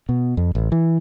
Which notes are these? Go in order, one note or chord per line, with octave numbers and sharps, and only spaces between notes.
B2
F2
A1
E3